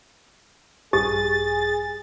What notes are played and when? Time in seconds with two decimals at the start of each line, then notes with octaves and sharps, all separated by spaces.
0.93 A#1 G2 G4 G#4 D#6 A6